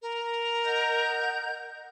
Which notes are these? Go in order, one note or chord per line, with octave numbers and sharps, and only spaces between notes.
A#4
D#5 F#5 G6